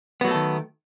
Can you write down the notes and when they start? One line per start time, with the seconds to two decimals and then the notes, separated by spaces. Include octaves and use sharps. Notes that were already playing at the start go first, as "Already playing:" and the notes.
0.21 B3
0.24 F#3
0.28 A3
0.31 A4
0.34 D#3